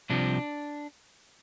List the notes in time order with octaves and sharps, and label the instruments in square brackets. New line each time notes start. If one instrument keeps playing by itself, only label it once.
[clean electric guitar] C2 C3 F3 D4